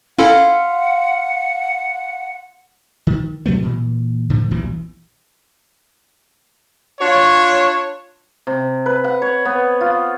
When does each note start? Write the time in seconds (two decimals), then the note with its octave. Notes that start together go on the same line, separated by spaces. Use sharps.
0.19 C#4 E4 F4 A4 F5 F#5
3.07 D#3
3.46 B2 F#3 A3 B3
3.63 A#2 E3
4.30 A2 D3 F3
4.51 D#1 B1 G2 E3
7.01 D4 F4 C#5
8.47 C3
8.86 B4
9.04 F#5
9.22 C#5
9.45 B3
9.81 F4